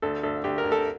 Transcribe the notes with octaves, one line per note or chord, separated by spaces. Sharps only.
D2 A4
D2 A4
D2 G4
A#4
D2
A4